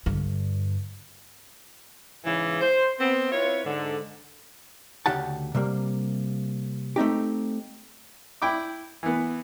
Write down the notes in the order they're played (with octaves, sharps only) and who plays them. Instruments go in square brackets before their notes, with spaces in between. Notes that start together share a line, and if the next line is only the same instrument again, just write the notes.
[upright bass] G2 D3
[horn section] G#2 C#3 E3
C5
B3 C4
C4 E4 F4 B4 C#5
G#2 D3
[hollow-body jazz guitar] D2 C#3 G4 F#5 A5
C3 G3 A#3
A3 C4 D#4 G4
[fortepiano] E4 G5 B5 D6
E3 B3